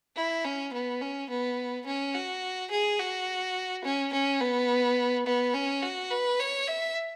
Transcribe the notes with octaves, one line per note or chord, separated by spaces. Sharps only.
E4
C#4
B3
C#4
B3
C#4
F#4
G#4
F#4
C#4
C#4
B3
B3
C#4
F#4
B4
C#5
E5